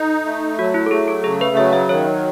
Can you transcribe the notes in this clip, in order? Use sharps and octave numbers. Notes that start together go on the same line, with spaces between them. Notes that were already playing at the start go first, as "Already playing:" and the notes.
Already playing: D#4 A4
A3
F#3 F#4
E4
A4
A3 G#4
A4
C#3 G#4
B4
F#3 E5
E5
D#3 C#5